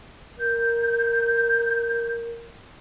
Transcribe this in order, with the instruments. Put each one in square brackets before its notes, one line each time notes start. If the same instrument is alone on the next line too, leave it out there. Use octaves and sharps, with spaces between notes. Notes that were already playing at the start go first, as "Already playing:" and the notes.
[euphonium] A#4 [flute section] G6